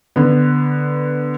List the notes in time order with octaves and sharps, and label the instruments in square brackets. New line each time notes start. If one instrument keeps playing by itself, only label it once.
[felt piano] D3 B3